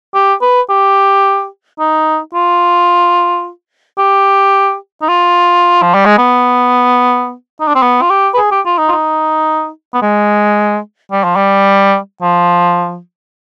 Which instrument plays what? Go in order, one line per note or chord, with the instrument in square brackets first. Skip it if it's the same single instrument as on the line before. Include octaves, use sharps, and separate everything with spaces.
[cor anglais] G4
B4
G4
D#4
F4
G4
D#4
F4
F3
G3
G#3
B3
D#4
D4
C4
B3
F4
G4
B4
G#4
G4
F4
D#4
F4
D#4
B3
G#3
G3
F3
G3
F3